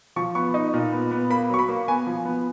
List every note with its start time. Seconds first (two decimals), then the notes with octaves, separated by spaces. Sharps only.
0.16 F3 C#6
0.35 B3 C#6
0.54 D#4
0.74 A#2
0.92 B3
1.11 B3
1.30 A#3 B5
1.50 F#3 C#6
1.59 B5
1.69 A#3
1.88 B3 G#5
2.07 F3
2.25 B3